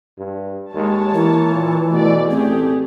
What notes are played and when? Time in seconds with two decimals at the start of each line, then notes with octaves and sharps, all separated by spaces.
0.18 G2
0.74 D#2 G#3 C#5 A5
1.14 E3 A#3 E4
1.54 A#2
1.91 B2 A3 D5
2.31 A1 A3 C4 G4 G#4